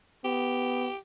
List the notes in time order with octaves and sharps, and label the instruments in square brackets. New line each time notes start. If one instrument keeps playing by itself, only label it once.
[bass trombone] B3 [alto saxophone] G4